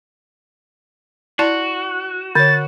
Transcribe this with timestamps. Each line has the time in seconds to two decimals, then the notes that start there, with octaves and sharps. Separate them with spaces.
1.39 E4 F#4 D5 A5
2.35 D3 C#5 A6